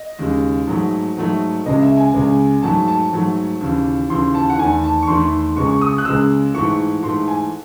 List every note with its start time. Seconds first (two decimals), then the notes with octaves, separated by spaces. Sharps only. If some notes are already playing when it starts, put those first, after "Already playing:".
Already playing: D#5
0.19 D#2 C#3 G#3
0.67 G#2 F#3 A3
1.16 G#2 F#3 A3
1.66 C#2 C#3 G#3 D#5
1.82 E5
1.97 G#5
2.14 C#2 C#3 G#3
2.63 G#2 F#3 A3 A5
2.88 A5
3.12 G#2 F#3 A3
3.61 D#2 C#3 E3
4.10 D#2 C#3 E3 C6
4.35 A5
4.50 F#5
4.58 E2 D#3 A3 G#5
4.84 A5
5.02 C#6
5.07 E2 D#3 A3 C6
5.56 C#2 C#3 G#3 C#6
5.69 C#6
5.81 D#6
5.98 F#6
6.05 C#2 C#3 G#3 E6
6.54 G#2 E3 A3 C#6
7.03 G#2 E3 A3 C6
7.28 G#5